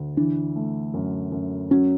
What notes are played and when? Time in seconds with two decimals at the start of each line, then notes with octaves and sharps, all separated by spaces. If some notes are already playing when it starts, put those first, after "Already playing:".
Already playing: D2
0.17 E3 D4
0.56 A3
0.94 F#2
1.32 F#2
1.71 F#3 C#4